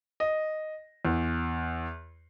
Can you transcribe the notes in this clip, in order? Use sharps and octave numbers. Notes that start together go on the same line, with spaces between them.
D#5
E2